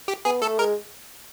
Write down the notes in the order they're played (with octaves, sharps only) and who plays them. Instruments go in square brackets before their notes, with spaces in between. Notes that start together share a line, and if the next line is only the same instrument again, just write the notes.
[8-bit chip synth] G4
[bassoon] B3 [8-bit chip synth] G#4
[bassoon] A3 [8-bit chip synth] A4
[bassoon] G#3 [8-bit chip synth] A#4